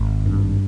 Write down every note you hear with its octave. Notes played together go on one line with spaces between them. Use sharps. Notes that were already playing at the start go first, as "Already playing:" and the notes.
Already playing: G#1
G2